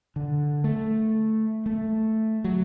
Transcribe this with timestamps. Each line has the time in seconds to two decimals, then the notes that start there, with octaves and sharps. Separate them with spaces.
0.16 D3
0.64 A3
1.66 A3
2.44 F#3